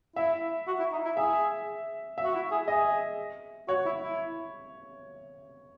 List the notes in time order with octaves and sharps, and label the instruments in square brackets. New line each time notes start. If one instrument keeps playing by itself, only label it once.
[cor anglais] E4 [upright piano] E5
[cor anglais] F#4
E4
D#4
E4
[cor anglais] G#4 [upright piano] E5
[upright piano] E5
[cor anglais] F#4
E4
G#4
[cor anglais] G#4 [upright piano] D#5
[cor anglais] F#4 [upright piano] C#5
[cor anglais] E4
E4